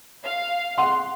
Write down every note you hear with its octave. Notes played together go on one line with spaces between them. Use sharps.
F5
F#5 C6